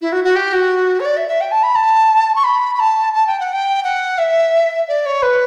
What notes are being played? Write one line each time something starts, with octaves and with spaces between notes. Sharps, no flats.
E4
F#4
F#4
G4
F#4
C#5
D5
E5
E5
G5
A5
B5
A5
C#6
B5
B5
A5
A5
G5
F#5
G5
F#5
E5
D5
C#5
B4